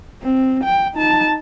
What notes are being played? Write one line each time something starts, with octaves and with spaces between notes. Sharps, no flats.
C4
G5
D#4 A5